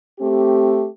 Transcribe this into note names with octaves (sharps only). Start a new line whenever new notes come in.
A3 C4 G4